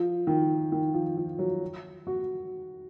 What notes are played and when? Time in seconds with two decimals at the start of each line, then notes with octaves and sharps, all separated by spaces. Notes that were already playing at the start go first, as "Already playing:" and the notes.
Already playing: F3
0.27 D#3
0.72 D#3
0.94 F3
1.17 F3
1.39 F#3
2.07 F#4